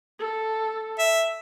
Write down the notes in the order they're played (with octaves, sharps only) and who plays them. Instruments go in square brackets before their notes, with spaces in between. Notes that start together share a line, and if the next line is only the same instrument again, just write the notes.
[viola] A4
[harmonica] E5